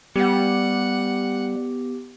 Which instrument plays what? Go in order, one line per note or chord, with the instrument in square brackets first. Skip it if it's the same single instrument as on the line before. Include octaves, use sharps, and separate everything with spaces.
[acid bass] G3 [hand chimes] B3 [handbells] G4 [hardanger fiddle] F#5